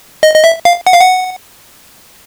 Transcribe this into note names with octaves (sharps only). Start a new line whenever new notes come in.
D#5
D#5
E5
F5
F#5
F5
F#5